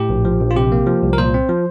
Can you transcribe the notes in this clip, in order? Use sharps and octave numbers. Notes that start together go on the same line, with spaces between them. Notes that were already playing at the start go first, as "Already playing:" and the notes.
Already playing: A2 G4
A#1
F3
A#1
F4
C3 G4
A#3
F3
C2
A#4
A#2 C5
C4
F3